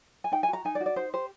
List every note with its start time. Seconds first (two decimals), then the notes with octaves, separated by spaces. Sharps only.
0.24 G#5
0.32 D#4 G5
0.43 G#5
0.48 F#4
0.53 A#5
0.65 D#4 G#5
0.75 D5
0.80 F#4
0.86 D5
0.96 D#4 C5
1.13 G4 C5